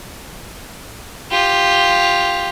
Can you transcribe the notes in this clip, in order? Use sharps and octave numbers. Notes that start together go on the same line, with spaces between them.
F4 G4